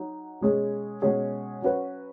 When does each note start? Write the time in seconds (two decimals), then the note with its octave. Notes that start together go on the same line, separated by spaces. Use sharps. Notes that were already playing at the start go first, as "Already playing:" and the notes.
Already playing: F#3 D#4 F#4
0.41 B2 G#3 C#4 G#4
1.02 B2 G#3 C#4 G#4
1.62 F#3 C#4 F#4 B4